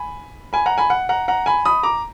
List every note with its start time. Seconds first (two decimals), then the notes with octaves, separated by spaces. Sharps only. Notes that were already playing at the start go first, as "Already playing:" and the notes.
Already playing: G#5 B5
0.53 G#5 B5
0.66 F#5 A#5
0.78 G#5 B5
0.90 F#5
1.09 F#5 A#5
1.28 F#5 A#5
1.46 G#5 B5
1.65 B5 D#6
1.83 A#5 D6